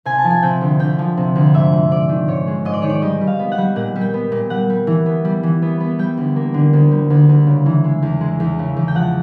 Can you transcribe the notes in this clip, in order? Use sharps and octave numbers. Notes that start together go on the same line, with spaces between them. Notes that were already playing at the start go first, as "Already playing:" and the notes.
C3 G#5
A5
F3
G#5
C3 G5
D2
D2 G5
F3
C3
D2
G#2 E5
G#2
G#2 D5
D#3
G#2 C#5
G#3
G#2 D#5
D5
D#3 C#5
D5
G3 D#5
G3
F5
B3
F#5
G3
A#2 F#5
G3
G5
B3
A#2
G3 F#5
G3
E3
B3
G3
E3
B3
B3
G3 G5
D2
A#3
D3
D2
G3
D2
D2
C#3
E3
G#3
E2
G#3
E2
C#3
E2
G5
F3 F#5